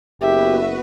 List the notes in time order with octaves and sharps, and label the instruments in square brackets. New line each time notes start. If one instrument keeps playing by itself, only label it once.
[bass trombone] F#1 [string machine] B3 F#4 B4 [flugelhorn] G4 [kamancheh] E5